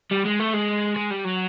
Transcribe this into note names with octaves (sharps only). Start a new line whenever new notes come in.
G3
G#3
A3
G#3
G#3
G3
F#3